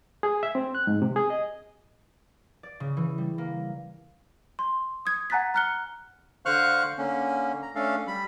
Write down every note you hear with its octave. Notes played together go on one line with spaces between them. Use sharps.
G#4
E5
C4
F#6
G#2
C3
G#4
D#5
D5
C#3
E3
G3
A#3
C6
D#6 G#6
F#5 G#5 A#5 F#6 A6 B6
A#5 F6 F#6 C#7 G7
D3 C5 F5 C#6 F6 F#6
D3 A#3 C#4
A#5
A3 C#4 D4 A4 F5
G3 B5